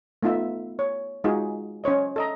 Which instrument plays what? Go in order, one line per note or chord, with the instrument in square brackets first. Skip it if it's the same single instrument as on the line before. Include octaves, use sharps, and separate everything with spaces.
[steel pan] A3 B3 D#4 F4 E5
C#5
G#3 D#4 F4 F#4 G#4
C#4 C5 C#5 D#5
A4 D#5 A#5